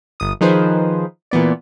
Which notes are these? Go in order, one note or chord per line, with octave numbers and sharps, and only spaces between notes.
G1 D#6
D#3 F3 D#4 G#4 B4 C5
A#2 E3 B3 D5